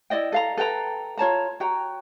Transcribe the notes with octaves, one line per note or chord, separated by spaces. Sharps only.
E4 D5 D#5 G5
A4 F5 A#5
A4 B4 G5 A#5
F4 C#5 A5 A#5
F#4 G5 A#5